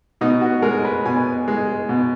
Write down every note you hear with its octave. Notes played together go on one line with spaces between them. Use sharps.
B2 D#4
F#4
G#3 A#4
B4
B2 G#5
G#3
B2